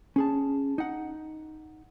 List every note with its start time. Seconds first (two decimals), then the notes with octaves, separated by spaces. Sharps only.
0.16 C#4 G#4 A5
0.78 D#4 F#5